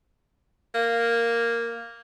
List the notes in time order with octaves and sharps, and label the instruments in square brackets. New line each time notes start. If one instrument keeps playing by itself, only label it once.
[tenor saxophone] A#3